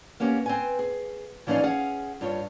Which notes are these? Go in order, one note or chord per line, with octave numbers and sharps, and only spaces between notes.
A#3 B3 C#4 G4
C4 B4 G#5
G#4
E3 F3 C#4 D#4 D5 F5
C#4 G#4 F5 F#5
G2 F4 C#5